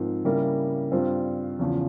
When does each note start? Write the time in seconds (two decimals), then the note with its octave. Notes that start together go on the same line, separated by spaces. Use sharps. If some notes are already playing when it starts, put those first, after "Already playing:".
Already playing: G#2 F3 C4 F4 A#4
0.25 C#3 G3 A#3 E4 A#4
0.92 G2 G3 C4 F4 C5
1.59 E2 C#3 F3